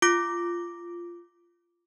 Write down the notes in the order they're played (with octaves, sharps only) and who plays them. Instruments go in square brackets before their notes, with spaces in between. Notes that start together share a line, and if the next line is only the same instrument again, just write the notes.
[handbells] F4 D6 A#6